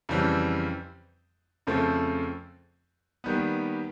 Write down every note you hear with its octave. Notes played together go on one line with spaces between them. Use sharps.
F2 C#3 E3 G3 C4
F2 C#3 F3 A3 C4
D#2 D#3 G3 B3